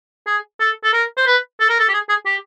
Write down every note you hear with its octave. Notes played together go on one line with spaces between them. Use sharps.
G#4
A4
A4
A#4
C5
B4
A4
A#4
A4
G4
G#4
G#4
G4